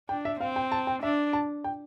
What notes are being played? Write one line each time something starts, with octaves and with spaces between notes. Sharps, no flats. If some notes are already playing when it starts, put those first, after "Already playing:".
D4 G5
E5
C4 F5
G5
A5
G5
D4 E5
A5
G5